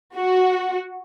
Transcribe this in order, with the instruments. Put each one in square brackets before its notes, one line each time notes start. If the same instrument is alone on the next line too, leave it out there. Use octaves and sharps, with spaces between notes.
[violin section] F#4